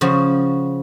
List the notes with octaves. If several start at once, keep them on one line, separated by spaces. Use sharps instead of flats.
C#3 F3 F#4